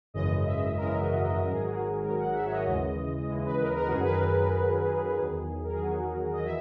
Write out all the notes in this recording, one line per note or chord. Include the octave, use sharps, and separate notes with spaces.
G#1 F#2 C#3 E3 G#3 D#5
E5
G#1 F#2 C#3 E3 G#3 A#4
F#4
A#4
G#1 G#2 D#3 F#3 A#4
G#4
F#4
G#4
G#1 G#2 D#3 F#3 A#4
F#5
E5
C#5
D#5
D#2 C#3 E3 G#3
D#2 C#3 E3 G#3
B4
A#4
A#4
F#4
F#2 D#3 F#3 G#4
B4
A#4
B4
B4
F#2 D#3 F#3 A#4
E2 D#3 F#3 G#4
A#4
G#4
E2 D#3 F#3 F#4
D#5
E3 E5